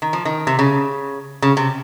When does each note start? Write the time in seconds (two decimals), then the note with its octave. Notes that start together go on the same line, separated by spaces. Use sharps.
0.02 D#3
0.13 F3
0.25 D#3
0.47 C3
0.59 C#3
1.42 C#3
1.57 C3